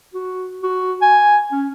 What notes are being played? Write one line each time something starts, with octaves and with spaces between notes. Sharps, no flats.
F#4
F#4
G#5
C#4